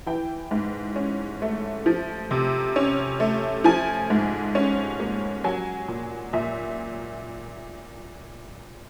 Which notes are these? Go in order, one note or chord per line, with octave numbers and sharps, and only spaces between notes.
E3 G5
G#2
C#4
A3
F3
C3
C#4
A3
F3 G#5
G#2
C#4
A#3
F#3 G#5
A#2
A#2 E5